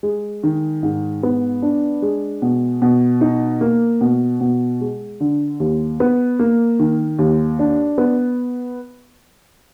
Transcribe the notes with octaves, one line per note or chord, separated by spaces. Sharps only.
G#3
D#3
G#2
B3
D4
G#3
B2
B2
D#4
A#3
B2
B2
G#3
D3
D#2
B3
A#3
D#3
D#2
D4
B3